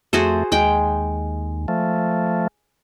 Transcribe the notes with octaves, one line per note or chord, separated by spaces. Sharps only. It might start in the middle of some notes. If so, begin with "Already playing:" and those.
F2 A3 F#4 G#4 C5
D#2 G#3 G5
F3 A3